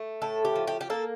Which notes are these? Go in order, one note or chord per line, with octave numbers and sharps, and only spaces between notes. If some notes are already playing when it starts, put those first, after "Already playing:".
Already playing: A3
A2 A4
G4
F3
G4
G4
A#3 A4